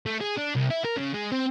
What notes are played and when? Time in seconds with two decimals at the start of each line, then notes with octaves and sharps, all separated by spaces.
0.06 A3
0.21 G#4
0.37 D4
0.55 C2
0.70 E4
0.85 A#4
0.97 C#3
1.14 G#3
1.32 C4